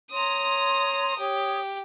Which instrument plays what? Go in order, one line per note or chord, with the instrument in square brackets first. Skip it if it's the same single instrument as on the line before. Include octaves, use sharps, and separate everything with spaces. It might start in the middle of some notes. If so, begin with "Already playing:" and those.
[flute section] C#5 C6 [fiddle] A#5 D#6
[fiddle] G4 [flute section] C#5 D#6